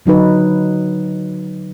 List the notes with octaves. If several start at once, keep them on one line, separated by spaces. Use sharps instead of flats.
D3 F#3 D#4 B4